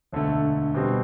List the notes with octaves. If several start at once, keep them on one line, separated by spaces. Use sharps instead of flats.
E1 D2 D3 A3
B2 G3 C4 G4